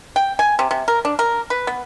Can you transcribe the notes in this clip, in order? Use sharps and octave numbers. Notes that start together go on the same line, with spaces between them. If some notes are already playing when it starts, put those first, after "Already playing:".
G5
G#5
C3
C3
A#4
D4
A#4
B4
B3